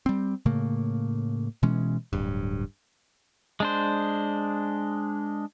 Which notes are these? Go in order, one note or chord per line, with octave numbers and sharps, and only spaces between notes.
G3 C4
A2 C#3 A3 A#3
B2 E3 G#3 C#4
D1 G2
G#3 D4 C5